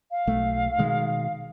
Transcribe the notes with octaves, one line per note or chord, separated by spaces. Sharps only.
F5
B1 A3
B2 D#3 G#3